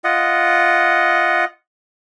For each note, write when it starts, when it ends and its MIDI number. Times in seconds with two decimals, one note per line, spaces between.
0.04 1.45 65
0.04 1.45 75
0.04 1.45 78